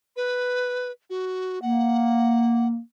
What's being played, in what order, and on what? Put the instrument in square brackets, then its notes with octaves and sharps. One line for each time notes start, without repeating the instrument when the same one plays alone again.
[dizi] B4
F#4
[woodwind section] A#3 [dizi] F#5